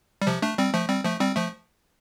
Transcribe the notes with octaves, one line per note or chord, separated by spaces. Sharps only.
G3
C3 F3
A3 D4
G3 C4
F3 A3
G3 C4
F3 A3
G3 C4
F3 A3